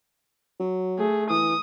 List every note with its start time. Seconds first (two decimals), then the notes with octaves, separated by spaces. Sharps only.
0.60 F#3
0.99 A3 G#4
1.30 E3 D#6